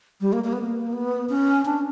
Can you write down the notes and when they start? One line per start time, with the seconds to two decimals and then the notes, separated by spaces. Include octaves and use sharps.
0.21 G3
0.33 A#3
0.44 A#3
0.53 B3
0.62 A#3
0.93 B3
1.29 C#4
1.65 D4